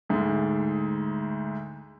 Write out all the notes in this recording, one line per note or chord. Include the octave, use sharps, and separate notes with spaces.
D2 G#2